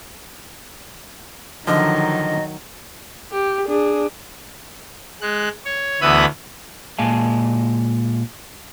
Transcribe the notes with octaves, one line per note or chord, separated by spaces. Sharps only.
D3 D#3 F3 F#3 D#4 D#5
G4
D4 G#4
G#3 F#6
C#5
D2 E3 B3 E5 B5 D#6
A#2 G#3 F5 G#5 A5